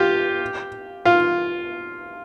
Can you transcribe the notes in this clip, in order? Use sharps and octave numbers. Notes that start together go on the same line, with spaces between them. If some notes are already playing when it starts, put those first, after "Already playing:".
Already playing: F4 G4
F4